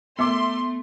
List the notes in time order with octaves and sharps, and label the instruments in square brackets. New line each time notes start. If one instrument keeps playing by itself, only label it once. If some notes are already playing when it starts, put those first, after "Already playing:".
[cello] A3 [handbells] B3 [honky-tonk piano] E5 D6 [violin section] C6